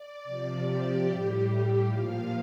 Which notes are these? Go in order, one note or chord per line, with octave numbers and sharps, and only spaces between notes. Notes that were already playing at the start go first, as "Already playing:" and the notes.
Already playing: D5
C3 F3 D5
G4
A2 G3
A#2 F3 F5